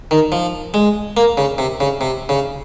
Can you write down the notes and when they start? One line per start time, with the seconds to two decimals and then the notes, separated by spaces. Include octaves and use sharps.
0.11 D#3
0.32 F3
0.74 G#3
1.17 A#3
1.37 C#3
1.58 C3
1.80 C#3
2.01 C3
2.29 C#3